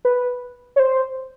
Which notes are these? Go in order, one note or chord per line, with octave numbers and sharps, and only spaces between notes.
B4
C#5
C5